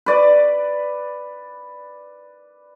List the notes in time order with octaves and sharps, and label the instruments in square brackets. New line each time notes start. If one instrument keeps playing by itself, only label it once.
[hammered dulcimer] B4 D5